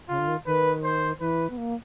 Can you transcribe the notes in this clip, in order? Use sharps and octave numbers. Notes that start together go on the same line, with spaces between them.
C#3 F4
D3
D#3
D#3 B4
C5
E3 B4
B3
A#3